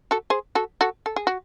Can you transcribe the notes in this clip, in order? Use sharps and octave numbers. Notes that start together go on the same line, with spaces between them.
F#4 A4
G#4 C5
F#4 A4
F#4 A4
A4
G#4
F#4